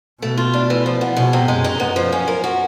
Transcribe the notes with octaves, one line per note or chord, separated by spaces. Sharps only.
B2 A3
F4
D4
E3
F3
B3
B2 G#3
C3
F#2 G#3
D#4
F#2 B3
F3
C#4
A#4
F#4